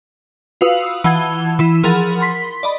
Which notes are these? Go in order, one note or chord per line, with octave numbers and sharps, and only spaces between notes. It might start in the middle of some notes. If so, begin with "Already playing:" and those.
F4 F#4 B4 F5 D#6 E6
E3 F#5 A5 G#6 G7
E3 E4
F3 G#4 A#4 F#5 B5 A6
C6 B6
D5 D#5 B5